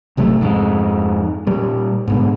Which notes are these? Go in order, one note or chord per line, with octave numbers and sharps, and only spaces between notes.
G#1 C3 F#3 A3
F2 G#2
A#2 G3
G#2 B2 D3